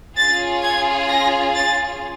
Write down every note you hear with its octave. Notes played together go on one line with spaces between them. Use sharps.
C#4 F4 G#4 A6
G#6
A#6
A6